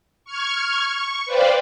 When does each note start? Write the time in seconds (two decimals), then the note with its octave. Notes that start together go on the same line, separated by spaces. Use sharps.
0.25 C#6 F6 G#6
0.88 C#6
1.25 B4 C5 D5 F5 G5